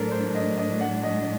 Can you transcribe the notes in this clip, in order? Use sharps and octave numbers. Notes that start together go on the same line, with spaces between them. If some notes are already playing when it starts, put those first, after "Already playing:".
Already playing: A2 F#3 A3 D4 A4 A#4 C5
C5
D#5
D#5
F#5
D#5